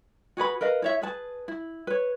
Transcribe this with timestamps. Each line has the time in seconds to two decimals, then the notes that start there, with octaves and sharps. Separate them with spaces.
0.37 F#4 G#4 B4 B5
0.61 A#4 B4 D#5 F5
0.82 E4 C#5 E5
1.02 G#4 B4 A5
1.48 E4
1.87 B4 C#5